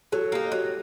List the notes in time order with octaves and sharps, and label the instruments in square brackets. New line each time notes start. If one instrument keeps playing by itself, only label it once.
[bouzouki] F#3 [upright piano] A4
[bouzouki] A#3 D#4 [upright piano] G4
[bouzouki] F#3